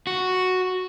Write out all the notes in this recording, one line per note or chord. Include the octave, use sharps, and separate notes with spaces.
F#4